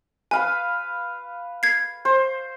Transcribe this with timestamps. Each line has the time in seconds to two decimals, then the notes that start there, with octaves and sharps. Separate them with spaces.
0.31 B4 F5 G#5 B5
1.63 G#6 C7
2.05 C5